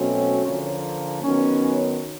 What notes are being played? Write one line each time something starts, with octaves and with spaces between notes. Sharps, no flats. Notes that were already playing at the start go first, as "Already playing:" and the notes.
Already playing: B2 F#3 A3 C4 C#4
D3 F3 A#3
D#3 F#3 B3 C#4